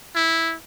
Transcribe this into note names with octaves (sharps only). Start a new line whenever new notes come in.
E4